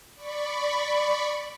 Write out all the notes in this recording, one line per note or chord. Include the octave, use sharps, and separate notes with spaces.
D5 B5 C#6